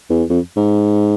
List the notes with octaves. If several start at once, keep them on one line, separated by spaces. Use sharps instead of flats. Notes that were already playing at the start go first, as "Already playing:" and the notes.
E2
F2
G#2